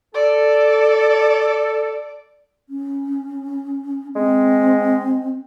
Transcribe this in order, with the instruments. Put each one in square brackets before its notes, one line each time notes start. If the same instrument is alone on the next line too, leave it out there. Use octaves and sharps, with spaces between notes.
[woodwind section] A4 [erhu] D5
[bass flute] C#4
[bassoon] G#3 [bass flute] C4